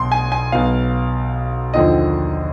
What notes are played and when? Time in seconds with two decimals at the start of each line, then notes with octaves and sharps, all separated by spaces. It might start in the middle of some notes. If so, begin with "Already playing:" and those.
Already playing: B1 B2 C6
0.12 G#5
0.32 G#5
0.52 B1 B2 B3 F5
1.74 D#2 D3 F3 C4 D#5